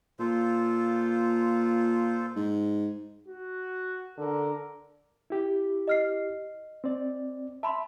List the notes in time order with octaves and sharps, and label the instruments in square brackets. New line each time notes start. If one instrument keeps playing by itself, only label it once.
[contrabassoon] A#2 [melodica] F4 A4 C5
[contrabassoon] G#2
[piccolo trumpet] F#4
[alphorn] D3 [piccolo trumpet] A#4
[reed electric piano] E4 G4
[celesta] D#5 F6 C7
[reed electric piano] C4 D5
[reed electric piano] E5 [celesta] A5 B5 C6